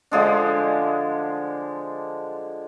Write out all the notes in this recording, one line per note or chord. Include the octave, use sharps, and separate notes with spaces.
D3 F3 G#3 D4